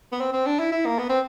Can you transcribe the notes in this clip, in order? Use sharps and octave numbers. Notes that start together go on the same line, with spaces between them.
B3
C4
C4
D4
E4
E4
A#3
B3
C4